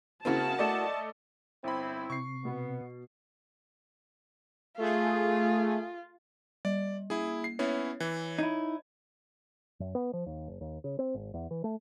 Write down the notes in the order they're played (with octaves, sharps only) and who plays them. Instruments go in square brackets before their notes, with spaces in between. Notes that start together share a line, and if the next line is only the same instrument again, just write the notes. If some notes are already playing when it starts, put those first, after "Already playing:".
[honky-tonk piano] C#3 C4 [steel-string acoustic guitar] A#3 E4 F#4 [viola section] A5
[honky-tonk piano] A3 D5 D#5
[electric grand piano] G1 B5 [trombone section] C4 E4
[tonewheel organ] C3 [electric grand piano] C#6 C7
[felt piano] B2 [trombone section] B3
[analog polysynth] A3 G#4 [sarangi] F4
[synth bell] G3 [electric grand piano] D5
[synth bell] A#3 [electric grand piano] E4 G#4
[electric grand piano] C7
[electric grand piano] B3 C#4 E4 [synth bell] C#5
[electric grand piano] E3
[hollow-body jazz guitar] D#4 E4 [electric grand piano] G#6
[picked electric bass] F#2
B3
F3
D#2
F#1
D#2
C#3
C4
G#1
E2
E3
A3